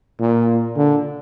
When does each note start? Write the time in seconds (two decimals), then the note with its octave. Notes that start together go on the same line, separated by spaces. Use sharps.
0.20 A#2
0.77 D3